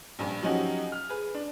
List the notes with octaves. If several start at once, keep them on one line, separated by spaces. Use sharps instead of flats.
A#1 G2
F3 F#3 C#4 D#4 F#4 G4
F6
G#4 B4
D4